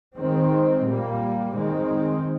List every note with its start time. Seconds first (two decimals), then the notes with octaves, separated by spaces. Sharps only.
0.15 D#3 G#3 C4
0.84 A#2 G3 A#3
1.54 D#3 G#3 C4